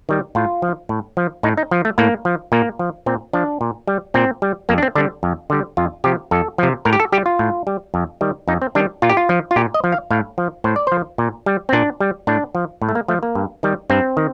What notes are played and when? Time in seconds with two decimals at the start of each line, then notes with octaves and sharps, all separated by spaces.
0.09 D#3 G3
0.35 A2 F4
0.62 F3
0.89 A2
1.17 F3
1.43 A2 D#4
1.57 D#4
1.71 F3
1.85 A3
1.98 A2 A#3
2.25 F3
2.52 A#2 A#3
2.79 F3
3.06 A#2 C4
3.33 F3 D4
3.61 A#2
3.88 G3
4.14 A#2 C4
4.42 G3
4.69 F2 A#3
4.78 D4
4.83 C4
4.95 D3 G3 D4
5.23 F2
5.50 D3 G3
5.77 F2 F4
6.04 C3 F3 G4
6.31 F2 A4
6.58 C3 F3
6.85 A2 A#4
6.93 G4
7.00 A4
7.12 G3 G4
7.26 F4
7.39 A2
7.67 G3
7.94 F2
8.21 D#3 G3
8.48 F2 D#4
8.62 C4
8.75 D#3 G3 D4
9.02 A#2 F4
9.10 G4
9.17 F4
9.29 F3
9.51 F4
9.56 A#2 G4
9.74 D#5
9.84 F3
9.92 F5
10.11 A2 F5
10.38 F3
10.64 A2 C5
10.76 D5
10.87 C5
10.92 F3
11.18 A#2
11.46 G3
11.69 C4
11.73 A#2 D4
12.01 G3
12.27 A2 D4
12.55 F3
12.82 A2
12.89 A3
12.95 A#3
13.08 F3 A3
13.23 A#3
13.35 G2
13.63 D#3 G3
13.90 G2 C4
14.17 D#3